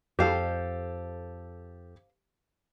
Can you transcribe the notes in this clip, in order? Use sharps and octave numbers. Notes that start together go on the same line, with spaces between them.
F2 G4 A4 C5 F5